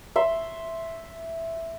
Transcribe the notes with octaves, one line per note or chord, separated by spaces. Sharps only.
E5 C6